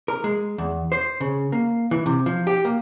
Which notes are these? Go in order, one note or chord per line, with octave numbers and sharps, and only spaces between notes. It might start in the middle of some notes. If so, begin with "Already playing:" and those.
A#4
G#3
E2
C5
C#3
A#3
E3
C3
F3
G4
A#3